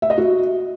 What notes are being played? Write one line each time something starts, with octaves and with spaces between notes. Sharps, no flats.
E5
D#5
F#4